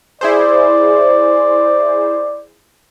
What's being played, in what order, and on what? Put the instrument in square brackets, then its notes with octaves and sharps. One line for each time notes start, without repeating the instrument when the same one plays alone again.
[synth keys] E4 G#4 C5 [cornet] D5